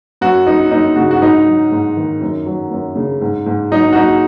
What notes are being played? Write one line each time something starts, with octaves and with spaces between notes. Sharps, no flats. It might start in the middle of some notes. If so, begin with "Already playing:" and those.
F#2 F#4
F#3 D#4
F#2 D#4
C#3 F#4
F#4
G#2 D#4
F#3
G#2
D#3
F#2
F#3
F#2
C#3
G#2
G#2
F#3 D#4
F#4
F#3 D#4